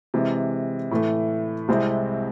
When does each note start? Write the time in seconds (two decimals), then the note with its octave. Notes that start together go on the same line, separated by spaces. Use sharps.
0.14 C3 E3 G#3
0.91 A2 E3 A3
1.68 C2 C3 G#3 C4 E4